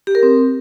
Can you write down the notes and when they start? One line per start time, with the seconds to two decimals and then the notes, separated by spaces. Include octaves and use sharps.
0.07 G4
0.15 A#4
0.23 C4